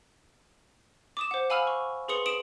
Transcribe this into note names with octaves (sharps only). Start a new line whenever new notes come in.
D6 D#6 E7
C5 F#5
F5 G#5 B5 E6 F6 F7
C#6
G#4 B4 C6 D#6 C#7 F7
D#6 D7 E7 F#7